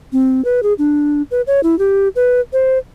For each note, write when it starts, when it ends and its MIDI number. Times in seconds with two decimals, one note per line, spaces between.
0.13 0.44 60
0.45 0.61 71
0.63 0.73 68
0.78 1.22 62
1.31 1.42 71
1.47 1.60 73
1.63 1.77 64
1.79 2.08 67
2.16 2.41 71
2.53 2.78 72